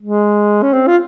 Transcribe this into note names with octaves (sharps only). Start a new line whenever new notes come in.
G#3
C#4
C4
F4